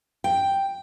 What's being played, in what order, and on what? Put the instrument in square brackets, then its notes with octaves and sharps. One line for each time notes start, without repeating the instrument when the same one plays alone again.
[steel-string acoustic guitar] G5